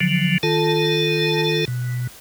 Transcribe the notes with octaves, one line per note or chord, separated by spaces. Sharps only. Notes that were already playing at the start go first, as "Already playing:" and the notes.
D3 F3 F#3
D#3 F4 A4 A5
B2